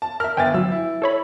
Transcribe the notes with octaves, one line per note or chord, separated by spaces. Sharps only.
A5
A#4 E5 F6
G1 E5 G5 G#5 A6
F#3 E6
E4
A4 C#5 B5